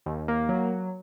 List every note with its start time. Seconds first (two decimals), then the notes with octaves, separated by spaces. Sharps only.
0.06 D#2
0.28 A#3
0.49 F#3